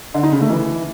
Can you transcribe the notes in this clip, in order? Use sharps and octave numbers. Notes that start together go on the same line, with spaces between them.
D3
D#4
C#3
A3
E3